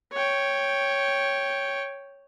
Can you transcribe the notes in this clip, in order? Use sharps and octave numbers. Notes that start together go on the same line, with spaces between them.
C#5 G5